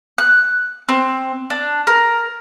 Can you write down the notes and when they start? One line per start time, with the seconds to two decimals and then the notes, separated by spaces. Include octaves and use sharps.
0.18 F#6
0.89 C4
1.50 D4
1.87 A#4